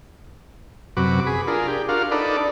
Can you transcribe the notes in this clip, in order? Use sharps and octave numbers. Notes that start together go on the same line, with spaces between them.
F#2 C3 F#4 B4 D6
G#4 B5
D4 F4 G#4 A#4
G4
D4 F4 F#4 A#4 F5
D4 D#4 A4 B4 D5